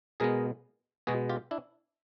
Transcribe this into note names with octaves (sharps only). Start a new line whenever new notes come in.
B2 G#3 B3 G#4 A#4
B2 G#3 B3 F#4 G#4
F4 G4
D4 E4